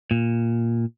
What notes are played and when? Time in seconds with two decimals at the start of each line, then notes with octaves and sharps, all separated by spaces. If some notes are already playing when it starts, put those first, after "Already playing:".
0.11 A#2